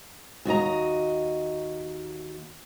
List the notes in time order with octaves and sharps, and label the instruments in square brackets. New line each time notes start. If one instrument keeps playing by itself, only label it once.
[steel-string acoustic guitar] D#2 F#4 D#5 A#5